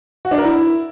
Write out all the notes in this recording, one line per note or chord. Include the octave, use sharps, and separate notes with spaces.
F#4
D4
A#4
E4